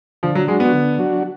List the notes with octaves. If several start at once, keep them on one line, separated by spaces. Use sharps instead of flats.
D3 F3
F#3
F#3 G#3 D4 F#4
B3
D3
F#3 D4 F#4